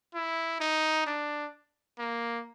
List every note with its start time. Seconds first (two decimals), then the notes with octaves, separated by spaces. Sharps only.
0.15 E4
0.61 D#4
1.06 D4
1.99 A#3